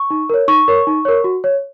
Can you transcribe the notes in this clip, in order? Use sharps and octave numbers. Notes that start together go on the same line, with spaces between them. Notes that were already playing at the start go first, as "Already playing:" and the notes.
Already playing: C#6
D#4
A#4 C#5
D#4 C#6
A#4 C#5
D#4
A#4 C#5
F#4
C#5